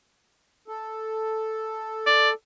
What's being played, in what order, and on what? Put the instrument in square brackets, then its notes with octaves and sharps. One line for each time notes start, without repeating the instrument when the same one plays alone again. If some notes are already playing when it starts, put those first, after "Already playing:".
[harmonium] A4
[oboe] D5